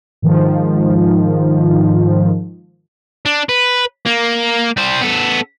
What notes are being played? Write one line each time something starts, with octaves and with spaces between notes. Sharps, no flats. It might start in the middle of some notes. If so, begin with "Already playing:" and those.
G#2 D#3 F3
D4
B4
A#3
G3 C5
B3 A4